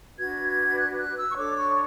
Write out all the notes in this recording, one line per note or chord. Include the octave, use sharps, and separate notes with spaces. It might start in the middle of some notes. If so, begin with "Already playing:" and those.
D4 F#4 B4 G#6
G#6
F#6
F#6
E6
C#6
D4 A4 C#5 D6
C#6